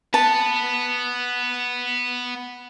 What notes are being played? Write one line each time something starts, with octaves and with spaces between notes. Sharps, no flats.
B3 B4 A5